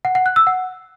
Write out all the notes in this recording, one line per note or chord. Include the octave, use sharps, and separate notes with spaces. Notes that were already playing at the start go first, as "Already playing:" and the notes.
F#5
F#5
F#6
E6
F#5